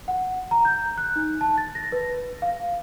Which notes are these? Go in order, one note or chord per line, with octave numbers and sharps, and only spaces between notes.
F#5
A#5
G6
F#6
D#4
A5
A6
A#6
B4
F5